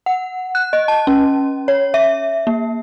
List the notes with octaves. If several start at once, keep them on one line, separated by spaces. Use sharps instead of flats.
F#5
F#6
D#5
A5
C#4
C#5
E5
A#3